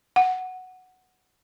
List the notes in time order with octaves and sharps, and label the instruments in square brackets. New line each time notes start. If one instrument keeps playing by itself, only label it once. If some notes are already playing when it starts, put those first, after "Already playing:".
[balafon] F#5